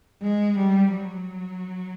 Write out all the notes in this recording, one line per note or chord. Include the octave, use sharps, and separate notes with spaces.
G#3
G3
F#3